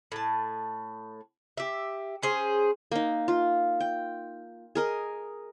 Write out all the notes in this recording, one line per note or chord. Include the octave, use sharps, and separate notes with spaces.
A2 A5
G4 E5
C#4 G#4 C5
A#3 D#4
F4
G5
G#4 A#4 D#5